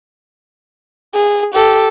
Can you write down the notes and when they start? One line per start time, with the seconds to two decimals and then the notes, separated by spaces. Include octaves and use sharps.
1.14 G#4
1.54 G4 A4